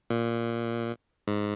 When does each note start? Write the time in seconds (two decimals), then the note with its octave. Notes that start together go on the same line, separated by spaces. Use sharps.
0.10 A#2
1.27 G#2